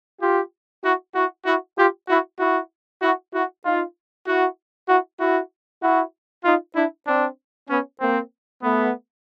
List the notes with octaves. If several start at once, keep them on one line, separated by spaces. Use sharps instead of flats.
F4 G4
E4 F#4
E4 F#4
E4 F#4
F4 G4
E4 F#4
E4 F#4
E4 F#4
E4 F#4
D#4 F4
E4 F#4
E4 F#4
E4 F#4
E4 F#4
D#4 F4
D4 E4
C4 D4
B3 C#4
A#3 C4
A3 B3